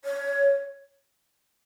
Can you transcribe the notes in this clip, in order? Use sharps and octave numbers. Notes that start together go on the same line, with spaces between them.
C#5